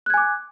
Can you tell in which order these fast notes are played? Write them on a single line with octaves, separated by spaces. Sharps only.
F#6 G#6 G#5 D6